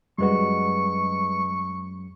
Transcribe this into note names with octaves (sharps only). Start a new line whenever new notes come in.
F#2 G3 G#3 F#4 B4 C#6